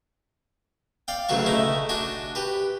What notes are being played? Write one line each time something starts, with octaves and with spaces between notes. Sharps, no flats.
D5 F5 G5
D2 C#3 E3 F#3 F#4 C#6
A3 D#4 E4
D4 F#4 G#5 D6
G4 B4